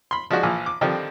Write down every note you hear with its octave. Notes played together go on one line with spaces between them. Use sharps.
B5 C6
F3 G#3 D4 F#4
A#1 E3 F3
D6
D3 D#3 F3 G3 C4 D#4